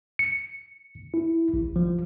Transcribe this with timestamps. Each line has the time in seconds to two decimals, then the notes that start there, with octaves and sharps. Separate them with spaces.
0.19 C#7
1.14 E4
1.54 A1
1.76 F3